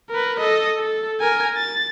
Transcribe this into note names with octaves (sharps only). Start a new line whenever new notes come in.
A#4 B4
A4 D#5
A4
A#4 G#5
A6